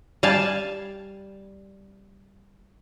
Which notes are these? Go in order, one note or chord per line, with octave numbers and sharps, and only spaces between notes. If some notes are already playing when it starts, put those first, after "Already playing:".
G3 F5 G#5 A5